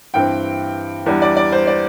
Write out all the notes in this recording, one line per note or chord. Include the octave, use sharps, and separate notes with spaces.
G2 E3 C4 G5
E2 E3 G3 D4
D5
D5
C5
D5